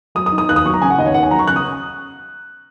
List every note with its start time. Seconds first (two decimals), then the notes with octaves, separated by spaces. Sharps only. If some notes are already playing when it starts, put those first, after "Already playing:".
0.15 F#3 D#6
0.26 D#6
0.32 D#4
0.38 D#6
0.49 D#2 F#6
0.56 D#6
0.65 F#3 C#6
0.74 A#5
0.82 C#3 G#5
0.90 F#5
0.98 D#2 D#5
1.06 C#5
1.14 D#2 F#5
1.23 G#5
1.31 F#3 A#5
1.39 C#6
1.47 C#3 F#6
1.56 D#6